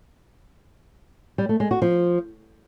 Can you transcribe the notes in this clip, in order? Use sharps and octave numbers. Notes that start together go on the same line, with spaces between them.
G3
A3
G#3
F#4
F3